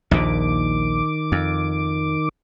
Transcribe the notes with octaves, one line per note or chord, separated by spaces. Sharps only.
A#1 D#2 A#2 D#3 D6
F2